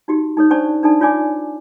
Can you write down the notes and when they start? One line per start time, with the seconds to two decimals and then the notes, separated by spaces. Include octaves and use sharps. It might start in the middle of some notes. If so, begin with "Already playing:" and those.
0.08 D#4 F#4 G4
0.37 D#4 A4 C#5
0.51 C#4 D4 C5 D5 A5 C#6
0.83 D4 D#4 A4 D5 A5
1.00 F4 C#5 D5 G#5 D6